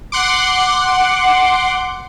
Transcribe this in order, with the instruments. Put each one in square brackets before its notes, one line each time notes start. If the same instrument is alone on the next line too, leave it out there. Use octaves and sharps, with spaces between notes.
[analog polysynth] F#5 C6 D6